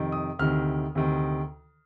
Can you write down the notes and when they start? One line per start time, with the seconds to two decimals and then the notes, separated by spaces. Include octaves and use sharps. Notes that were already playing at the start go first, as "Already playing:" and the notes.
Already playing: F2 C3 D#3
0.12 D#6
0.39 D2 C3 D#3 F6
0.95 D2 C3 D#3